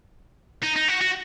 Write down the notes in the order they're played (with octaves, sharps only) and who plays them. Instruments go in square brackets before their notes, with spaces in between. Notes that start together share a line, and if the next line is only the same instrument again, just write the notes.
[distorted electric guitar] D#4
D#4
F#4
F#4